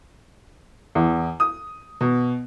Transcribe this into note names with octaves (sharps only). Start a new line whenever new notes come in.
E2
D#6
B2